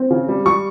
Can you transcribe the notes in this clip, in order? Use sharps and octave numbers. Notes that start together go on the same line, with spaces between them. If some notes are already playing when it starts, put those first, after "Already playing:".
Already playing: C4
C#3
G3
G3 C#6